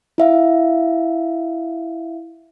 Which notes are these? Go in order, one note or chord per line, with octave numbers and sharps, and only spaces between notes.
E4 E5 F5